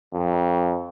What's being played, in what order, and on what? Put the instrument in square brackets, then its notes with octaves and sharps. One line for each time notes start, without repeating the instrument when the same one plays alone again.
[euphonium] F2